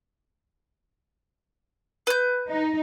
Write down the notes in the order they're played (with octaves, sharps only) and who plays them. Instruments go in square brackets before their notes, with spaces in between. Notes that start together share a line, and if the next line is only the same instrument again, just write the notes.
[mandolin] B4 G6
[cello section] D#4